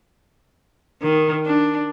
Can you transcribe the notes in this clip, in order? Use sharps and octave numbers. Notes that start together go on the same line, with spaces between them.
D#3
D4